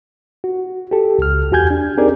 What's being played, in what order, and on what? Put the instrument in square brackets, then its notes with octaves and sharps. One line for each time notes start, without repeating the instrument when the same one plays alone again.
[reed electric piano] F#4
G4 A4
C#2 F6
E2 F#4 G4 G#5 G6 G#6
D4
C4 D#4 G4 G#4 A#4 D5